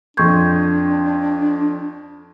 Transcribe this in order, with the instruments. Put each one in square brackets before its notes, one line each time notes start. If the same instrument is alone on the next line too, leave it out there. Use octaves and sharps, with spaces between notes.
[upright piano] F2 C6 [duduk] D4 [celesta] C#6 G6 G#6